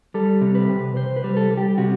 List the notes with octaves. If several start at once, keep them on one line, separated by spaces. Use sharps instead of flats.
G3 A4
C3
B4
C3
C3 C5
B4
G3
A4
G3
G4
C3 F#4